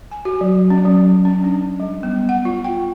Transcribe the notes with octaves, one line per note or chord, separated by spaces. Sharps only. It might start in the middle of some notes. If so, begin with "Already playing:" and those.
G#5
F#4
F#3
C#4
F#3
C#4
D4
G3
B3
F#5
F4
G5